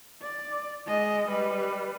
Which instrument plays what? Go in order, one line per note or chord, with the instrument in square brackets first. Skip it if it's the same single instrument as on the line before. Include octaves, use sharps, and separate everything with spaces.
[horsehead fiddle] D5
G#3 D#5
G3 B4